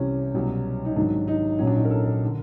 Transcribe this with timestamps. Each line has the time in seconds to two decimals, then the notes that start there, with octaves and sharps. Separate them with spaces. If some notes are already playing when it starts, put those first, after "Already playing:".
Already playing: C2 C3 E3 C#4
0.34 C2 B2 F#3
0.85 D#4
0.96 G#1 G#2 D#3 F#3 D4
1.28 D#4
1.59 A#1 A#2 F#3 C#4
1.67 D4
1.75 D#4
1.85 A#4
1.91 A4
2.06 A#4
2.25 D3